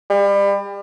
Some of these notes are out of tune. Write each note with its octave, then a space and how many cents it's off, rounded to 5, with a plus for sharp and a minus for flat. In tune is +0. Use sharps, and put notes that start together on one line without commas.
G3 +30